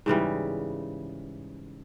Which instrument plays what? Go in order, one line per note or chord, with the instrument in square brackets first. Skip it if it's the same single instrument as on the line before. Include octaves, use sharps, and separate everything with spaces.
[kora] G#2 C#3 E3 G3